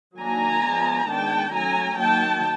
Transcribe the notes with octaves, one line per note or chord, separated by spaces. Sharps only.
D#3 F#3 A#3 D4 G#5 A#5
F3 G#3 B3 D4
D#3 G#3 B3 D4 G5 A5
F#3 A3 C#4 G#5 A#5
D#3 F#3 A#3 G5 A5